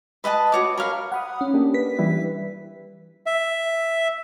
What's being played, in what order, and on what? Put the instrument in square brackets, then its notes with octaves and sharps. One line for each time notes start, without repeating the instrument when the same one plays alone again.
[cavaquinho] B4 D#5 F#5 A5
F#4 C#5 D6
A#4 C#5 F5 B5
[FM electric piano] F#5 B5 D#6
C#4
[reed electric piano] A#3 D4 G4
[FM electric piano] B4 B6
[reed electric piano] E3 G3 E4
[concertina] E5